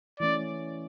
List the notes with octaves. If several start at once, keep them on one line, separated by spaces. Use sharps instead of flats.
E3 A3 C#4 D5